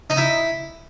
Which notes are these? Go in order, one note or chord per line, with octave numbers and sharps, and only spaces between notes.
D#4
E4